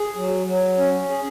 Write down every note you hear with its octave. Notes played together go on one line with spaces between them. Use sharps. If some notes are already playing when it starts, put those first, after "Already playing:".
Already playing: G#4
F#3
F#3
C#4
G#4